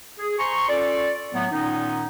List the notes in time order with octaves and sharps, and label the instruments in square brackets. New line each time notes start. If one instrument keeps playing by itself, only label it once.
[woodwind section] G#4
C5 G#5 A#5 C6 C#6
C#4 F4 A4 D5
A2 F#3 A3 B3
A#2 D#3 B3 C#4 D#4